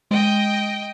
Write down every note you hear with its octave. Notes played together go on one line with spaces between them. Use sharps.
G#3 D#5 G5 D#7